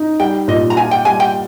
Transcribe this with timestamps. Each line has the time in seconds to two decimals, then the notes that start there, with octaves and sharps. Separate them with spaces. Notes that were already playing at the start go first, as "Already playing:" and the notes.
Already playing: D#4
0.20 G3 G5
0.48 A#2 D#5
0.70 A#5
0.76 F4 G#5
0.91 G5
1.05 G3 G#5
1.20 G5